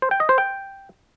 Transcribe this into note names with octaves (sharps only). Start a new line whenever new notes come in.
C5
G5
D#5
C5
G5